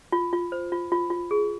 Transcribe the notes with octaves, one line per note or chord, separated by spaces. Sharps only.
F4
F4
C5
F4
F4
F4
G#4